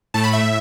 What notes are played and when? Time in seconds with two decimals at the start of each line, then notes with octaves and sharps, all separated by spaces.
0.14 A2 A3 A5
0.24 B5
0.33 E5
0.43 A2